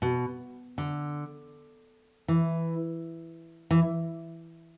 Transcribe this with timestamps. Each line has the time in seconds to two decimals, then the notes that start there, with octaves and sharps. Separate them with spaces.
0.02 B2
0.78 D3
2.28 E3
3.71 E3